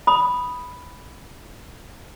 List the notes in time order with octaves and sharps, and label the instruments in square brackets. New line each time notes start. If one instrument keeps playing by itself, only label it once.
[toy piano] B5 D#6